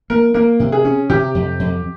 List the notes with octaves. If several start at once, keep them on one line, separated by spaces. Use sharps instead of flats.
A#3 A#4
A#3 A#4
C3
G#4
C#4
C3 G4
F2
F2